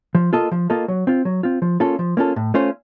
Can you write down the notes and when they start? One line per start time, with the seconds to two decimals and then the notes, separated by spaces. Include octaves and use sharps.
0.15 F3
0.33 A#3 F4 A4 D#5
0.52 F3
0.70 A#3 F4 A4 D#5
0.88 F#3
1.07 C4 F4
1.25 F#3
1.43 C4 F4
1.62 F3
1.80 A#3 C#4 F4 A4
1.99 F3
2.17 A#3 C#4 F4 A4
2.36 A2
2.54 A3 C#4 F4 C5